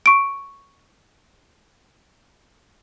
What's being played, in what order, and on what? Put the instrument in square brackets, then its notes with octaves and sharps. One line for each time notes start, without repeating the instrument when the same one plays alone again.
[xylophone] C#6 D7